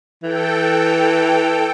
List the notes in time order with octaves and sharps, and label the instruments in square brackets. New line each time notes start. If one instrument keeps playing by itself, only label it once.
[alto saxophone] E3 [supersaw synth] A4 G5